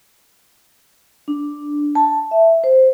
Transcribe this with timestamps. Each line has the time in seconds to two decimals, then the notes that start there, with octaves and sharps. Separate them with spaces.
1.28 D4
1.95 A5
2.31 E5
2.64 C5